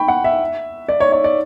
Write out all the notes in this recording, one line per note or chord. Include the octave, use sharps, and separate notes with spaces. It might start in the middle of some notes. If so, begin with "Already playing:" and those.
Already playing: G5 B5 C#6
F#5
E5
D5
C#5
C#5
D5